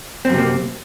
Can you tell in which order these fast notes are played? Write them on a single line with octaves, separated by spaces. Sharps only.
C4 F#2 C3 A#3